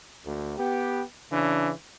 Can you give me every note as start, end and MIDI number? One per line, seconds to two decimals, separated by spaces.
0.25 0.55 38
0.58 1.02 59
0.58 1.02 67
1.31 1.71 49
1.31 1.71 52
1.31 1.71 62